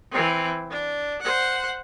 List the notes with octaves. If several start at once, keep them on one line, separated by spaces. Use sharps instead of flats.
E3 C4
D4
C5 F#5